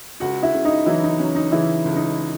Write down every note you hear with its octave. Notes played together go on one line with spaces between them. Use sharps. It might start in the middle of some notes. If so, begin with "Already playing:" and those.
C#2 F#4 F#5
E4 E5
C#3
D#4 D#5
E3 F#3 E4
D#4
F#3 C#4
D#4
C#3 E3 E4
C#2
D#4